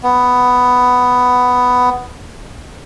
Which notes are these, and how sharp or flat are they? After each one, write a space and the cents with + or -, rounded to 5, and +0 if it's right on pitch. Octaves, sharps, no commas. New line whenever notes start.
B3 +5